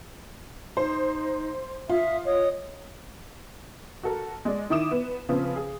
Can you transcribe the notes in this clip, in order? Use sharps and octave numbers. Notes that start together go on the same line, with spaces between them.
D#4 C5
F4 E5 D#6
C#5 D#5 D#6
F#4 A4 A#4
G#3 D5
D#3 E4 D6 D#6 E7
B3
C#3 F3 B3 C4
G#4